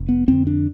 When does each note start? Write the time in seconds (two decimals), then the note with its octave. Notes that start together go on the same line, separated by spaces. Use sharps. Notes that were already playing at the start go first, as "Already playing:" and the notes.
Already playing: F1
0.09 B3
0.28 F2 D3 C4
0.47 D4